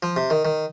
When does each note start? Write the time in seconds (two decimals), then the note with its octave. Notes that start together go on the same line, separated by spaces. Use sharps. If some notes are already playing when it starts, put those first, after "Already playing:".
0.03 F3
0.16 C3
0.30 D#3
0.45 D#3